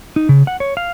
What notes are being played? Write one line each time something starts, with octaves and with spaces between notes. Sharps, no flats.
D#4
C#3
F#5
C#5
F5